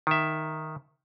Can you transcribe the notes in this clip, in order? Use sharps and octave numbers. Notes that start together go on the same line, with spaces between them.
D#3 E5